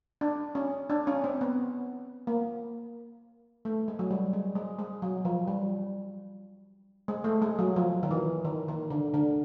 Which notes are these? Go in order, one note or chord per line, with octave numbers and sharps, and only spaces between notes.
D4
C#4
D4
C#4
C4
B3
A#3
A3
G#3
F#3
G3
G#3
G#3
G#3
F#3
F3
G3
G#3
A3
G#3
F#3
F3
D#3
E3
D#3
D#3
D3
D3